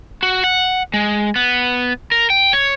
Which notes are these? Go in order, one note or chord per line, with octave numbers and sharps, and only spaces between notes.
F#4
F#5
G#3
B3
A#4
G5
C#5